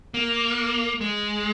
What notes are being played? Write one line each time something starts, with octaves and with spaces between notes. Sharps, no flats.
A#3
G#3